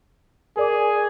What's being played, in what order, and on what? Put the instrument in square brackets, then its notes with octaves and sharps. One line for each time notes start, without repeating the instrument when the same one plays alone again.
[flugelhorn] G#4 [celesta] A#4 D5 D6